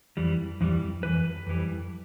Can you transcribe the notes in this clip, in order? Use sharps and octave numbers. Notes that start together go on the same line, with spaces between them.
F2 E3 G3
F2 E3 G3
F2 E3 B4
F2 E3 G3